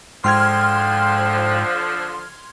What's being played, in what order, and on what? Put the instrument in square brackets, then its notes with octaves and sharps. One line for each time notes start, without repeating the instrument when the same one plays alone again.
[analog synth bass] G#2 [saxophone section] D3 F3 [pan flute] G5 [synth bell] C6 F6 G#6